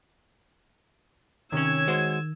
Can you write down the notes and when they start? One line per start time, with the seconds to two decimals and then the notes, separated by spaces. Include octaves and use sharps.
1.52 C3 D#3 C#4 C#5 E6 G#6
1.88 G#3 F#4 C5